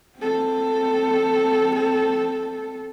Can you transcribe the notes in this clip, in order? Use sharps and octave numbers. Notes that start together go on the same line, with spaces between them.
C4 A4